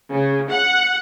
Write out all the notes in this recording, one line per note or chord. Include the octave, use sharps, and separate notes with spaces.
C#3
F#5